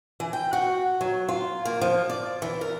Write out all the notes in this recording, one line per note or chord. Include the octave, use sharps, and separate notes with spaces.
E3
G5
F#4
F#3
F4
A#3
F3
D5
E3
A#4